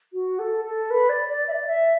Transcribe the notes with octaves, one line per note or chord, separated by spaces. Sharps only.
F#4
A4
A4
B4
D5
D5
E5
D5
E5